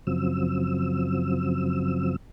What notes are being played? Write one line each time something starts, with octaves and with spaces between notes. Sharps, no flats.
F#2 C#3 F3 F#3 C4 E6